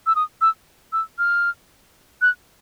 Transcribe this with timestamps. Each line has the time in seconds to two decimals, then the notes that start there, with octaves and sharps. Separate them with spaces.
0.07 E6
0.15 D#6
0.41 E6
0.93 E6
1.19 F6
2.22 F#6